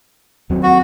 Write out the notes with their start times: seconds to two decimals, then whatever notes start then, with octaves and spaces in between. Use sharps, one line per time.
0.50 D#2 F#3 C4
0.63 F#4